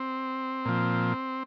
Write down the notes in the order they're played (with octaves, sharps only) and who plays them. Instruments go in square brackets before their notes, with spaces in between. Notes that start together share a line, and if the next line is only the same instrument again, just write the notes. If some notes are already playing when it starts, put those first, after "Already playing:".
Already playing: [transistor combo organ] C4
A#2 F3